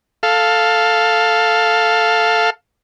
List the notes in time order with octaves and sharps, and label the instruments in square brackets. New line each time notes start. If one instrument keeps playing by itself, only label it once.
[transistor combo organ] A4 F5